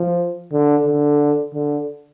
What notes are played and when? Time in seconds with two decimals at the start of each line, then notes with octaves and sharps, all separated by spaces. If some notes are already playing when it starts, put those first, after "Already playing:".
Already playing: F3
0.53 D3
0.87 D3
1.54 D3